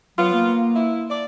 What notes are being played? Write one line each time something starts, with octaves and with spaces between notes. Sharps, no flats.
F#3 B3 F4
A#3
E4
D5